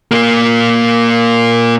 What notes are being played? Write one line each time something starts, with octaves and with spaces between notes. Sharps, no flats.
A#2 A#3